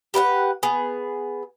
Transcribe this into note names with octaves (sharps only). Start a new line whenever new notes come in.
G4 B4 F5 F#5
B3 G#4